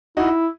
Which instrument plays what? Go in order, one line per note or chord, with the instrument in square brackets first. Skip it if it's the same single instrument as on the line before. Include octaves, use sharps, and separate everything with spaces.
[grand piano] D#4 F#4 [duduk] E4